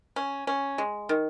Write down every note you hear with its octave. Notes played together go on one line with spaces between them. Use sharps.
C#4
C#4
G#3
D#3